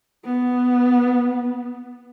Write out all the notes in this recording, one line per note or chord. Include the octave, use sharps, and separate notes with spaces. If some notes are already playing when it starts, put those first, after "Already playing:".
B3